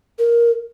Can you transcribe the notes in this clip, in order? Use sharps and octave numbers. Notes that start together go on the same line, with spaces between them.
A#4